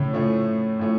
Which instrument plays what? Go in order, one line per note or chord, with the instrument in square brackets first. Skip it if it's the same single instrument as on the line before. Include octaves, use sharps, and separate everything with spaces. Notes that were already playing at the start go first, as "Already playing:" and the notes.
Already playing: [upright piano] A2 A3 C#4 [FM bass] C#3
[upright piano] A2 F3 A3 C#4
A2 F3 A3 C#4